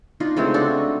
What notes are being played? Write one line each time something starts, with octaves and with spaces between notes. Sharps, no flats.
D4 D#4 F4
C#3 G#3 A3 C4
D4 F#4 A4